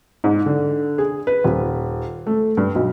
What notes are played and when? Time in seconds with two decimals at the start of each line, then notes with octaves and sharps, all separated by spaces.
0.24 G#2
0.46 D3
0.98 G#4
1.27 B4
1.44 D#1
2.27 A3
2.57 G2
2.75 B1